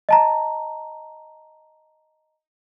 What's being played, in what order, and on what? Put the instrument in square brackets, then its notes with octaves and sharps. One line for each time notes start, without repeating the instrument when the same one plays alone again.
[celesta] D#5 A5 A#5